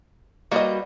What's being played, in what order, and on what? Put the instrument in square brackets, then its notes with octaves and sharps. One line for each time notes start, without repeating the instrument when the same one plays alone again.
[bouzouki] G3 F#4 G5 [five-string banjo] A#3 B4 D#5